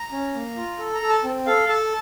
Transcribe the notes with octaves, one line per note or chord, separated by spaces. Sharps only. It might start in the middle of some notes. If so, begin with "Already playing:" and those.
Already playing: A#5
C#4
A#3
F4
A4
A#5
A4
A5
C4
A4 F5
A4 A5